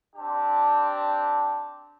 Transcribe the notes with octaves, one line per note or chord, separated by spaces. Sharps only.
C4 D4 G4 A5